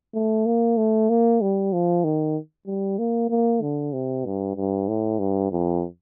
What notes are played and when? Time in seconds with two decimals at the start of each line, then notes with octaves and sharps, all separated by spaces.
0.14 A3
0.46 A#3
0.78 A3
1.10 A#3
1.41 G3
1.73 F3
2.04 D#3
2.67 G3
2.99 A#3
3.30 A#3
3.62 D3
3.93 C3
4.26 G2
4.56 G2
4.88 A2
5.19 G2
5.52 F2